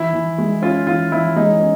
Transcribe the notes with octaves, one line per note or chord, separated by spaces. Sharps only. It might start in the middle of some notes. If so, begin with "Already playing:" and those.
Already playing: E3 E4
E3
G#3
C#4 F4
E3 F4
E3 E4
G#3 D#4
C#4